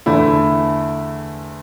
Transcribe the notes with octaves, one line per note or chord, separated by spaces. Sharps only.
E2 D3 A3 E4